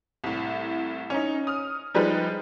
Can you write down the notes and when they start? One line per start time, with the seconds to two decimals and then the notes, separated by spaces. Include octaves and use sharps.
0.24 C2 A2
1.10 C#4 D#4
1.47 D#6 F6
1.94 F3 G3 G#3 D4 D#4 B4